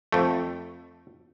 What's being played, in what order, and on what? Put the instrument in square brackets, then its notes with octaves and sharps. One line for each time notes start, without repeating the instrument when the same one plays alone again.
[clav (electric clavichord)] F2 A3